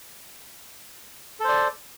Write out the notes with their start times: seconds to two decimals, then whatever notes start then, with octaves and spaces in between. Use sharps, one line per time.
1.40 A4
1.44 C5
1.49 D5